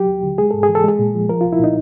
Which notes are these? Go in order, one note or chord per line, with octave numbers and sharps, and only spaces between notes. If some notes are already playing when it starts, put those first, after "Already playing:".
Already playing: F#3 G4
D#2
D3
G#3 G#4
G#2 A4
G#4
E3
A4
G#3 G#4
A#2
F3
F3 A#4
C2 F4
E4
A#2 D#4